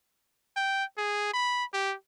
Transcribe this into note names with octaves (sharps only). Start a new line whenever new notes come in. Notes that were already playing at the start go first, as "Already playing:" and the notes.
G5
G#4
B5
G4